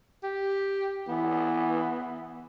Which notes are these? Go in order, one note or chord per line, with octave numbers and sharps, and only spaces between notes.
G4
E3 B3